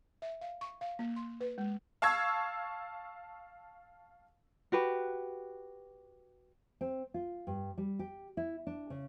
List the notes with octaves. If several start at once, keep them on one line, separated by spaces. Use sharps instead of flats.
E5
F5
C#6
F5
A#3
C6
B4
G#3
F5 A5 C#6 E6 G#6
F#4 G4 B4
C4
F4
G2
G3
G4
E4
D4
C#3